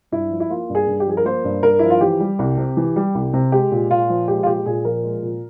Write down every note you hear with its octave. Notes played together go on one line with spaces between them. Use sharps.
G2 E4
F3
E4
A#3 F4
G2
G#4
G2
G4
F3 G#4
A#4
A#3 C5
G2
G2 A#4
F3 E4
F4
E3 G4
G3
C2
C3
E3
G3
C2
C3
G#3 G4
A#2
A#2 F4
F3
G#3 G4
F4
A#2 G4
A#2 G#4
F3 A#4
G#3
A#2